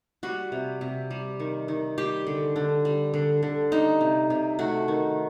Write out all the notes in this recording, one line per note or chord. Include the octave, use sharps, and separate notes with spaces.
G3 F#4
C3
C3
G3
D#3
D#3
G3 G4
D3
D3
G3
D3
D3
G3 D#4
C3
C3
A3 F#4
D#3